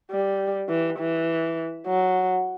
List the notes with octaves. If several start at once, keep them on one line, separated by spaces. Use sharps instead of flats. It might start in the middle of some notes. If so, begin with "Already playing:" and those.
G3
E3
E3
F#3